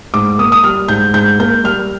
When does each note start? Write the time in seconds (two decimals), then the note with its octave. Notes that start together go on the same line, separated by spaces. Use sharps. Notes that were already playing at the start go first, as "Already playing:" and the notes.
0.14 G#2 D6
0.38 A#3 D#6
0.52 D#6
0.64 G3 F6
0.88 G#2 G6
1.14 G#2 G6
1.39 A#3 G6
1.64 G3 F6